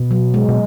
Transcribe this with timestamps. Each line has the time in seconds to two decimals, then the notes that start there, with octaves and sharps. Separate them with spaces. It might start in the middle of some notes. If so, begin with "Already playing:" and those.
Already playing: B2
0.11 F#3
0.34 G#3
0.49 B2